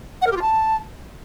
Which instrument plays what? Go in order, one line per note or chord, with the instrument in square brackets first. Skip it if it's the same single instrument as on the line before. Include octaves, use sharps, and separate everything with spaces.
[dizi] F#5
A#4
G4
F4
A5